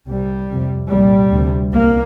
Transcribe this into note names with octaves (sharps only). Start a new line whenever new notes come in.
C2 C3 G3
F2 C3
C2 A#2 G3
D2 C3
C2 A#3